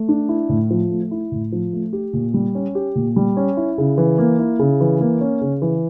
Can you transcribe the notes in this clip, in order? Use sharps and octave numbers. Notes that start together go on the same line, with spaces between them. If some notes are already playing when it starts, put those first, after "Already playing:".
Already playing: A3
D4
E4
A2
F3
A3
E4
A2
F3
A3
G4
A#2
G3
C#4
G4
A#2
G3
C#4
E4
C#3
E3
A#3
E4
C#3
E3
A#3
C#4
C#3
E3